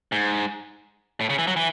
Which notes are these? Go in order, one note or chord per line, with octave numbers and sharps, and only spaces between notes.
G#2
A2
C#3
E3
F#3
E3